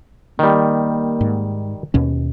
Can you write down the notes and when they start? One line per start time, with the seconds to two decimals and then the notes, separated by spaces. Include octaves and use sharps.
0.39 D#3 G3 A#3
1.21 G#2
1.94 D#2 B2 C#4